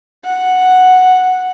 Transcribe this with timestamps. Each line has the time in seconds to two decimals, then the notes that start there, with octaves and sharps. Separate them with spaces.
0.25 F#5